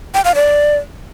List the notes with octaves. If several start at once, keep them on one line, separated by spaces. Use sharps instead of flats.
G5
F5
D5